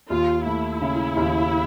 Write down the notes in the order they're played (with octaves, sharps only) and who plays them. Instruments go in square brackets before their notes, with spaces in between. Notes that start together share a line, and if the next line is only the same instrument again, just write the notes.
[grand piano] D#2 [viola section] F4
[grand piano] A3 [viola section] E4
[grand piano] C#3
D#2